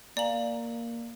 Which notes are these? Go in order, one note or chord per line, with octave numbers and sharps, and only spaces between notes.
A#3 D5 F5 G#5 A#5 F#7